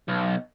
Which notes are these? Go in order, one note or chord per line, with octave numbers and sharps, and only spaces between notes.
B1